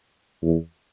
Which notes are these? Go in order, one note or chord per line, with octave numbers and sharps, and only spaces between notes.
E2